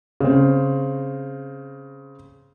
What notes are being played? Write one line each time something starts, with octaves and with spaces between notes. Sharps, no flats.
C#3 C4